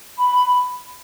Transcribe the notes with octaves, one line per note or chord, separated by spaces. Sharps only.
B5